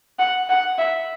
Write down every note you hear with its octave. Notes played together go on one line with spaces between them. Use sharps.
F#5
F#5
E5